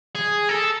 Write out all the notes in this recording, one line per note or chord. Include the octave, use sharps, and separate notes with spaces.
G#4
A4